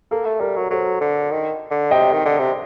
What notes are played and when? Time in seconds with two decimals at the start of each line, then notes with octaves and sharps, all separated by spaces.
0.11 A#3 A4
0.25 A3
0.40 G3 A#4
0.57 F#3
0.71 F#3 A4 C5
1.01 D3
1.31 D#3
1.71 D3
1.91 C3 D#5 G5
2.13 D#3
2.25 D3
2.39 C3